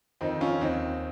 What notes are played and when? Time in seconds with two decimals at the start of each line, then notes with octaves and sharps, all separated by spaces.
0.21 F2 D#3 C4 D#4
0.41 C#4 F4
0.61 D#2 D#3 C4 D#4